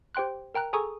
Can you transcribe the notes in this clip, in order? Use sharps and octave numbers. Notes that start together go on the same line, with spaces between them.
G4 C5 G5 C6 F#6
A#4 G5 A#5 F#6
G#4 A4 G#5 A#5 C#6 D#6